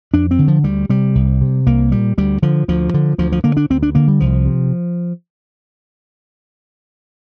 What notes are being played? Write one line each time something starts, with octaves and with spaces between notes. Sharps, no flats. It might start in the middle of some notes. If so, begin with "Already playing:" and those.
F2 D4
C4
D3
F3
D2 G3
C3 G3
C2
C3
C2 A#3
A#2 G3
D2 G3
D3 F3
D2 F3
D3
D2 F3
F3
D3 A#3
D4
D2 C4
D4
D3 A#3
G3
C2 F3
C3